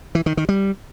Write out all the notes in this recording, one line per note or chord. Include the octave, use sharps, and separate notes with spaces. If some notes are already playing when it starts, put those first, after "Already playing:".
E3
D#3
D#3
G3